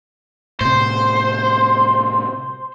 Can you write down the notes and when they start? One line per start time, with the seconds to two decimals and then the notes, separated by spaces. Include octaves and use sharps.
0.61 A2 C3 C5